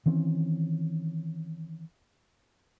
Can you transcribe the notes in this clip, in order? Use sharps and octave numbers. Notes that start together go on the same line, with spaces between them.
D#3 E3 C4 C#4